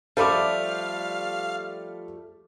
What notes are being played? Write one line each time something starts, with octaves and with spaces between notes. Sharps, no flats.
F3 G3 A3 A4 F5 B5 D6 F6